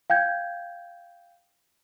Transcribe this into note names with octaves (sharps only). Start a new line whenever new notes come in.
F5 G5 G6 G#6